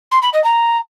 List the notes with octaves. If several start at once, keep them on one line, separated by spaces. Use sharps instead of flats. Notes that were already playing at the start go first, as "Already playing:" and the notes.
C6
B5
D#5
A#5